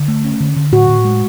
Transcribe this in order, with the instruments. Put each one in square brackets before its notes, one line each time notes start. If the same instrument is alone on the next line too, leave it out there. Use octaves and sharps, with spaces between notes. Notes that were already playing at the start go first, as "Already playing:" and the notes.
Already playing: [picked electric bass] D3
A3
C#4
D3
D3
[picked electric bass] A2 [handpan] F#4
[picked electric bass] A2
G#3